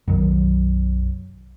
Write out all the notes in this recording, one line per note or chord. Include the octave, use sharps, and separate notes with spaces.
B1 F#2 D#3 F#3